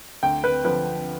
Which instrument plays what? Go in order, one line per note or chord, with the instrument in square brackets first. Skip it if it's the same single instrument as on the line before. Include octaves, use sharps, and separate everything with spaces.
[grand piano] D2 G5
B4
D3 F3 B4